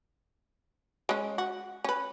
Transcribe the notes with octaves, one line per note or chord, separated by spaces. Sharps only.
G#3 C#4
F#4
C#4 B4